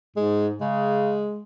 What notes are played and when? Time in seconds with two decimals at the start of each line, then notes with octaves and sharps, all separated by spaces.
0.16 G#2 G#3
0.61 C#3 G#3